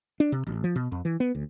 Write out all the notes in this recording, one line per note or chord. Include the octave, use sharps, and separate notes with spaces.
D4
C3
A1
F3
B2
F2
E3
B3
D2